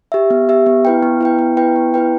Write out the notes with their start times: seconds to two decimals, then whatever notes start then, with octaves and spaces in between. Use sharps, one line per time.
0.12 G4 E5
0.30 B3
0.49 G4 E5
0.66 B3
0.85 E4 B4 G5
1.02 B3
1.21 E4 B4 G5
1.39 B3
1.57 E4 B4 G5
1.76 B3
1.94 E4 B4 G5